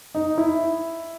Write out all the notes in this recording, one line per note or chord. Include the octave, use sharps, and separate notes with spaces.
D#4
E4